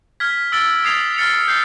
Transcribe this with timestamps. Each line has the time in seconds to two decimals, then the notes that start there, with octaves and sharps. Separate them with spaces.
0.20 F6 G#6 B6
0.52 E6 A6 D7 G7
0.85 D#6 G#6 C7 F7
1.16 F6 A6 C#7 F7
1.48 G6 C7